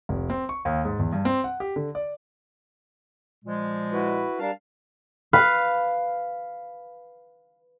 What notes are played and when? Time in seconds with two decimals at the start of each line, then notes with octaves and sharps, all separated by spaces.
0.09 F1
0.30 C4
0.49 C#6
0.65 D#2
0.85 G#2
0.99 E2
1.12 G2
1.25 C4
1.44 F#5
1.60 G4
1.76 D3
1.95 D5
3.44 A#2 F3 G#3
3.93 E4 F#4 B4
4.39 G3 D4 A#4 F5 A5
5.33 B4 F5